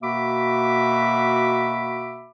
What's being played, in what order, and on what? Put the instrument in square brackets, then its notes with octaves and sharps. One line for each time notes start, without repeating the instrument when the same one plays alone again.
[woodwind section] B2 A#3 F#4 E5 B5 D6